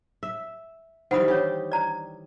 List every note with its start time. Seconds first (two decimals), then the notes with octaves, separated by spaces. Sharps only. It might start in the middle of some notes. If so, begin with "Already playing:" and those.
0.23 E5
1.11 D#3 E3 G3 C5 F#5 B5 D#6
1.28 D4 G4 C#5
1.72 D5 A#5